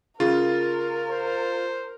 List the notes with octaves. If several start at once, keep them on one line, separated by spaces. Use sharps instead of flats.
C#3 F4 A#4
C5